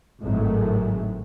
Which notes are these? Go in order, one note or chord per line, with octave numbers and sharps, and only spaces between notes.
G#1 A2 D#3 F#3 G#3 A3